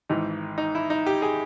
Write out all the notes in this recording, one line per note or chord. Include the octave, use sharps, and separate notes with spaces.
G#1 G#2 E3 D#4
D#4
E4
D#4
G4
G#4